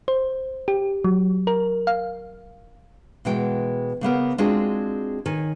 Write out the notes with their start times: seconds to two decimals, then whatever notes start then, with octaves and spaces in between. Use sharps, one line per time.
0.08 C5
0.68 G4
1.04 F#3
1.47 A#4
1.87 F5
3.25 B2 E3 G#3 F#4 G5
4.01 C#3 A#3 B3 A#4
4.38 G#3 C4 D4 F4 F#4 G#4
5.26 D#3 C#5 G#5